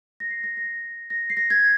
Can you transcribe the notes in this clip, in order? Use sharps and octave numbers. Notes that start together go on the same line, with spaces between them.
A#6
C7
A#6
A#6
A#6
C7
A#6
G#6